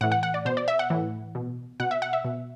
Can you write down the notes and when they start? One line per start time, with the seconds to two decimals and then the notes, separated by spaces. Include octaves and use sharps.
0.01 A2 E3 F#5
0.12 F#5
0.23 F#5
0.34 D5
0.45 B2 C5
0.57 D5
0.68 E5
0.79 F#5
0.90 A2 E3
1.35 B2
1.80 B2 F#5
1.91 E5
2.02 F#5
2.13 E5
2.25 B2